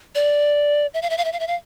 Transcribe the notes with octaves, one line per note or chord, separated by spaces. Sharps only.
D5
E5
F5
E5
F5
E5
F5
E5
F5